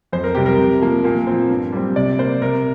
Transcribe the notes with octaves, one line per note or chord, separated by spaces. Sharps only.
F2 C5
A#4
C3 G3 G4
A#4
C3
F3 A#3
A#2
F3 C4
G2
G3 C4
C3 D5
A#3 C5
C3 A#4